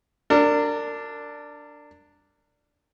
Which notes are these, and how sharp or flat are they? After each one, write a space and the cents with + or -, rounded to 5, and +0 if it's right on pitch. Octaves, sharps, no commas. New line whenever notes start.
D4 +0 A#4 -30